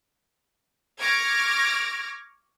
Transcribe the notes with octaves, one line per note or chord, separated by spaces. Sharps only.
C#6 D6 F6 G#6 A#6 D7